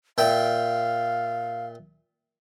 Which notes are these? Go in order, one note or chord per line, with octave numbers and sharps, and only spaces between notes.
A#2 E5 F5 G5